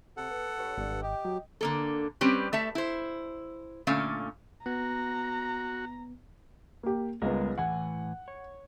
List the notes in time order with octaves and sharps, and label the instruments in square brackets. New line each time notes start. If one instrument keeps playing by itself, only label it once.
[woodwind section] C3 [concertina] A4 F#5
[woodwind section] B3
G2 B4 C#5
[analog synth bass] G#1 [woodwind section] G2
[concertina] G4 [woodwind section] D#5 G5
[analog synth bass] F#3
[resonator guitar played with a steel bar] D3 A#3 A4
G3 C4 C#4 G4 B4
A3 E5 A5
E4 C5
A#2 D3 A3 C#4 F5
[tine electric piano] B3 [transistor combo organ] F#4 [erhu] A#5
[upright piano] A#3 G4
[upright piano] C#2 B3 [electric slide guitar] G3 G#3 A#4
[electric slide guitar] A2 E3 G#5 [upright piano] F#5
[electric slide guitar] C#5